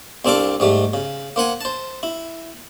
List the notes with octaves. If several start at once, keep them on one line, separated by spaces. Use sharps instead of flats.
C2 C4 D4 A4 F5 D6
G#2 G3 A3
C#3
A#3 C5 F#5 G#5
C5 A5
E4